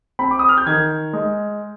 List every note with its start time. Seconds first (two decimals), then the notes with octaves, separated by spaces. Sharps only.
0.19 C4 B5
0.31 D6
0.39 D#6
0.49 F6
0.57 G6
0.66 D#3 G#6
1.13 G#3